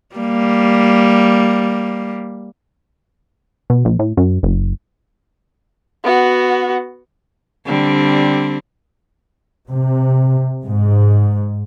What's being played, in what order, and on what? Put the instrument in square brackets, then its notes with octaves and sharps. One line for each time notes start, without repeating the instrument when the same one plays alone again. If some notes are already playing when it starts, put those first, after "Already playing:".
[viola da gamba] G3 A#3
[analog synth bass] B2
A#1
A2
F#2
F#1
[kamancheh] B3 F#4
[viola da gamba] D3 G3 C4
[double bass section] C3
G#2